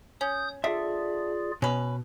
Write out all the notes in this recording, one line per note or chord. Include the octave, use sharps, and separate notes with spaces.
C#4 D#6 G6
D3 F4 G#4 D5 E5
B2 C#4 B4